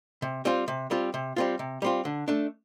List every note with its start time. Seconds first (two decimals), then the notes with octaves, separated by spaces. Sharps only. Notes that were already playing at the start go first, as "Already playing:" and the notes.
0.22 C3
0.45 G3 C4 F4
0.68 C3
0.91 G3 C4 F4
1.14 C3
1.36 G3 C4 F4
1.59 C3
1.82 G3 C4 F4
2.05 D3
2.28 A3 D4